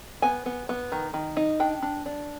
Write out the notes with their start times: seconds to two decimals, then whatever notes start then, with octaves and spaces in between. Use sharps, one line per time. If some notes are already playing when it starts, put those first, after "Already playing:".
0.22 B3 G#5
0.46 B3
0.69 B3
0.92 D#3
1.14 D#3
1.37 D#4
1.60 D4 G5
1.82 D4
2.06 D4